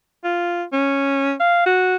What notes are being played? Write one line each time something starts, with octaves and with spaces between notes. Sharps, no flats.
F4
C#4
F5
F#4